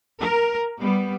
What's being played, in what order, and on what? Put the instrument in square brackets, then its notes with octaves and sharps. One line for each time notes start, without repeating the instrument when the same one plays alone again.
[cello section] A#4
G3 B3